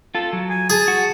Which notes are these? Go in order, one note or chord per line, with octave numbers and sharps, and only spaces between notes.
F4 A4
F#3
G#5
G#4 A5
F#4